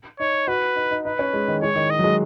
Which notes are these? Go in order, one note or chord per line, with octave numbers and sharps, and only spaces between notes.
D#4 C#5
F#4 B4
D#4
D#4
D#4 B4
C#4
G#3
D#3
G#3 C#5
D#3
D#5
F#3
G#3